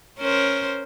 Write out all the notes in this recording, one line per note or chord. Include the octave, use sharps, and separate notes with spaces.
C#4 A#4 C5